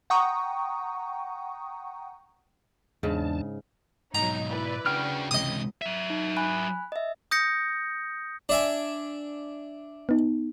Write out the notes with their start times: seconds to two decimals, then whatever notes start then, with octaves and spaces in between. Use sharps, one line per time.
0.10 F#5 G5 A#5 C#6 D#6
3.03 E2 G#2 C#3 D4 A5
4.15 G#2 B2 F#3 D#4 A#5
4.49 E4 B4 D5
4.86 C#3 D4 F#4 G5 F6
5.31 C#2 C3 E3 D#5 D#6
5.82 F#3 E5
6.10 D#4
6.37 G#5 B5 F#6
6.92 D#5 E5
7.31 D#6 G6 A#6 C#7
8.49 D4 E5 G#5
10.09 B3 D#4